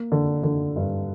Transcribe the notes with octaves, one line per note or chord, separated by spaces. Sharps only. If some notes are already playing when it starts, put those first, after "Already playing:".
Already playing: A#3
D3
D3
G2